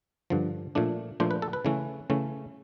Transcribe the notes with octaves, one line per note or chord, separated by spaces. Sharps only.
G2 D3 F3
A#2 F3 A3 D4
A#2 F3 A3 D4 C5
B4
A4
B4
C#3 E3 A3 C#4
C#3 E3 A3 C#4